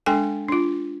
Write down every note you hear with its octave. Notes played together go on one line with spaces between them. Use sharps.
G#3 D4 A4 G5 G#5
D4 F4